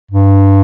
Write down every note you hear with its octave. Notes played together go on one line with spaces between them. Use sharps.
G2